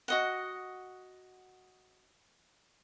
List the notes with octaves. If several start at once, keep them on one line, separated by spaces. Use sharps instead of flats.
F#4 D#5 F#5